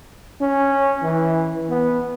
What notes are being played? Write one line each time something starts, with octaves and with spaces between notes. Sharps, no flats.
C#4
E3
B3